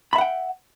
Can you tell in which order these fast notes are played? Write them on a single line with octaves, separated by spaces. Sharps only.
B5 E5 F#5 G5